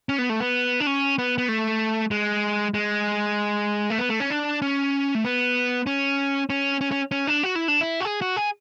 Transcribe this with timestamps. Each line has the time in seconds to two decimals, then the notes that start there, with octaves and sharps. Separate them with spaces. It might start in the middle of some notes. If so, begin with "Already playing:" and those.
0.09 C#4
0.18 B3
0.30 A3
0.40 B3
0.80 D4
0.87 C#4
1.18 B3
1.38 B3
1.48 A3
2.11 G#3
2.74 G#3
3.90 A3
3.98 B3
4.10 A3
4.20 C#4
4.30 D4
4.62 C#4
5.15 A3
5.24 B3
5.87 C#4
6.50 C#4
6.81 C#4
6.91 C#4
7.11 C#4
7.27 D4
7.43 F#4
7.55 E4
7.68 D4
7.81 E4
8.00 F#4
8.05 G#4
8.22 F#4
8.37 G#4